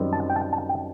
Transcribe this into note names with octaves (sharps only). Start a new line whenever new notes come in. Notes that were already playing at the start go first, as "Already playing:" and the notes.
Already playing: F#2 D#3 G3 C4
A5
G5
A5
A5
G5